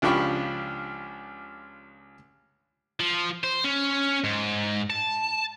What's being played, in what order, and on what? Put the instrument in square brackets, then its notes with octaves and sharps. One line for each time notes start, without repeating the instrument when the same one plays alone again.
[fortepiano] C#2 F3 D4 G4 B5 C#6
[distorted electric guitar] F3
C5
C#4
G#2
A5